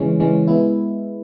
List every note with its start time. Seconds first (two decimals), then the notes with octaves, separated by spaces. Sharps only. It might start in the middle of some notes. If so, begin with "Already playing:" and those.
Already playing: C#3 E3 G#3 C#4
0.20 C#3 E3 G#3 C#4
0.47 G#3 B3 E4